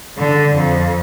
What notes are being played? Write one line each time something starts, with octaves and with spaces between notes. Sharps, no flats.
D3
F2